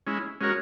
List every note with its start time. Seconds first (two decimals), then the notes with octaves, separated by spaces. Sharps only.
0.07 G#3 C#4 E4
0.41 G#3 C#4 F#4 A#4 C#5